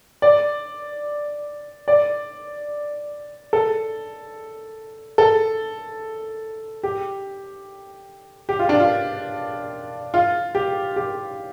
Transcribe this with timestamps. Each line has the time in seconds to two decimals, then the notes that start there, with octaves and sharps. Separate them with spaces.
0.22 D5
1.88 D5
3.53 A4
5.18 A4
6.83 G4
8.49 G4
8.59 F4
8.69 D4
8.80 F4
10.14 F4
10.55 G4
10.96 G4